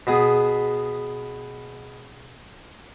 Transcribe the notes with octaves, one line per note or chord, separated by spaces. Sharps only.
B2 B3 G#4